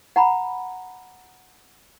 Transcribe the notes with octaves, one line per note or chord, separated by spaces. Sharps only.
F#5 A#5 B5